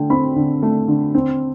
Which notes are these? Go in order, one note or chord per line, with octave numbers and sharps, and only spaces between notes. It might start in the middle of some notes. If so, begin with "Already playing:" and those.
Already playing: D3 A3 G5
C4 B5
D3
A3
D3
C4